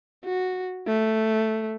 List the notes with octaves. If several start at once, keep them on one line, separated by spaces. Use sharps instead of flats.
F#4
A3